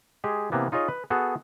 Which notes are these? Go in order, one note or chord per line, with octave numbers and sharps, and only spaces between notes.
G#3 G4 G#4
C3 E3 A#3 B3
D#4 F4 G#4 C#5 D#5
B4
B3 F#4 G#4 A4